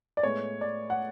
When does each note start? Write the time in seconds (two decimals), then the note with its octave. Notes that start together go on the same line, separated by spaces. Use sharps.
0.17 D5
0.23 A2 G#3 B3 C#5
0.61 D5
0.90 F#5